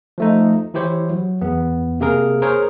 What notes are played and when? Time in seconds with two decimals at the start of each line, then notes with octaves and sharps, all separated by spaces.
0.18 F3 A3 D#4
0.74 E3 E4 G4 C5 C#5
1.10 F#3
1.41 E2 B3
2.00 C3 A#3 G#4 A#4
2.42 G#4 A#4 C5 C#5